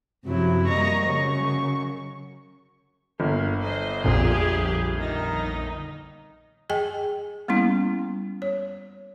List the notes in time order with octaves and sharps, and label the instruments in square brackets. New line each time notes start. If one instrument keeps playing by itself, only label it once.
[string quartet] F#2 C3 F3 F#3 E4
G3 A#3 D#5 A#5 C#6
F#2 C#3 F#3 C#6
[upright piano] G1 [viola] A#3
[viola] C5 D#5
[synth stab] A#1 F2 A#2 [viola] G4 G#4
[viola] D#3 D#4
[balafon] G#4 D#5 G5 G#5
G3 A#3 B3 C#4 E4
C#5